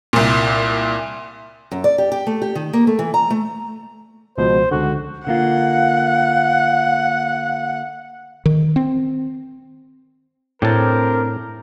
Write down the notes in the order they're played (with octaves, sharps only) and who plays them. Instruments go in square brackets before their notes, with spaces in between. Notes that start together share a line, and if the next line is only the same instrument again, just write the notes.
[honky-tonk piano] C2 A#2
[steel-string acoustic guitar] F#2
D5
G4
G4
A3
G4
D#3
A#3
A3
E3
A#5
A3
[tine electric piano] C#2 B2 F3 [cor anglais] C5
[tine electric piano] C#2 D3 [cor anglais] F#4
[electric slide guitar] D3 A#3 F4 [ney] F5 [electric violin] F#5
[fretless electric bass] D#3
C4
[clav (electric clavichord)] A2 A5 [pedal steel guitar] C4 D4 G4 [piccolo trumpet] A#4